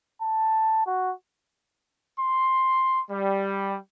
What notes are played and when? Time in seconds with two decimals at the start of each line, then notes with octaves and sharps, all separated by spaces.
0.22 A5
0.87 F#4
2.19 C6
3.11 G3